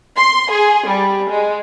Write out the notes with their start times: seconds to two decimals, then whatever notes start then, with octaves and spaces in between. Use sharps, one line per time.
0.17 C6
0.51 G#4
0.88 G3
1.30 G#3